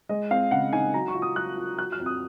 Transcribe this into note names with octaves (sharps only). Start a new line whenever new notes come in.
G#3 D#5
C4 F5
C#3 F#5
D#4 G#5
F#3 A#5
C#6
F4
D#6
F#3 F#6
F4
F#3 F#6
F6
F2
D#6